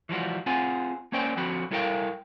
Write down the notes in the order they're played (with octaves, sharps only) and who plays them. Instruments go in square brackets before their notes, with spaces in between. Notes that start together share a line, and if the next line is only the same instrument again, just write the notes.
[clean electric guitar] E3 F3 G3 F#4
C4 F4 G#4 F#5 G#5
A#3 C#4 C5 D5 G5
D3 F3 C4 F#4 B5
G3 E4 A4 A#4 F5 G5